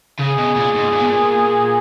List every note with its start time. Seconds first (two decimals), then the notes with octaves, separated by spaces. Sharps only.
0.19 C#3 G#4
0.39 B2
0.56 A#2
0.75 G#2
0.93 A#2
1.01 B2
1.09 A#2